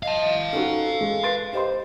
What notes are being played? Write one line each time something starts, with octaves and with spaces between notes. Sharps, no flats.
D#5 F5 A5
C#4 D#4 F#4 A4
G#3
B4 C6 A6 D7
G4 C5 D#5 C6